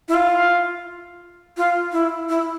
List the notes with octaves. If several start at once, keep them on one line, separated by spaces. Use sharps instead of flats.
E4
F4
F4
E4
E4